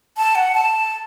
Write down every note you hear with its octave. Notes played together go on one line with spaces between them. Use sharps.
A5
F#5
A5